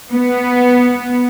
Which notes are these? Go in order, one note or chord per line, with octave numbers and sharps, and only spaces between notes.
B3